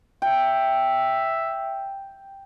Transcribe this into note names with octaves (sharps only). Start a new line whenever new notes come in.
E5 G5